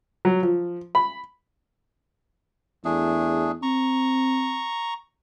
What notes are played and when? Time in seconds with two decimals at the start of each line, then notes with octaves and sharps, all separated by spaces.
0.25 F#3
0.43 F3
0.95 B5
2.85 E2 A3 D4 G#4
3.63 C4 A#5 C#6